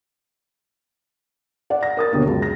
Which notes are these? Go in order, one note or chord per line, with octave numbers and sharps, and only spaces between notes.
D5 F#5
A#6
A#4 D#6 A6
D#2 B2 D3 A#3
C#2 F#2
A#6